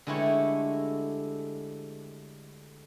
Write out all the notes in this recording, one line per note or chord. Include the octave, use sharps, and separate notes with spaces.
D3 G#3 A3 E4 G4 C#5